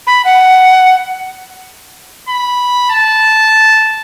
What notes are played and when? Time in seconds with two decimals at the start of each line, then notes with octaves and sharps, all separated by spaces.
0.07 B5
0.25 F#5
2.29 B5
2.90 A5